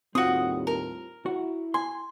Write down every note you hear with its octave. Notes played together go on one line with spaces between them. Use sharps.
D#2 A2 G3 C4 F4 F#4 D#6
A#4
E4 F#4
G#5 C6